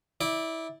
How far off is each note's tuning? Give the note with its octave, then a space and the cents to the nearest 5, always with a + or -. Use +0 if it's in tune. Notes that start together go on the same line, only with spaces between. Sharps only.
E4 -20 D5 +0